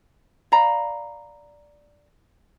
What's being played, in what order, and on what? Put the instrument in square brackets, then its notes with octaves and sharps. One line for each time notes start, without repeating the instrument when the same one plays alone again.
[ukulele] D5 F5 A#5 B5